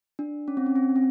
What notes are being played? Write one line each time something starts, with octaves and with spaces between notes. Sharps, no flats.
D4
C#4
C4
C#4
C4
C4